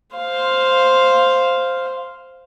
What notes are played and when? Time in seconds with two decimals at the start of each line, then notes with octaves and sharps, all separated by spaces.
0.16 C5 F5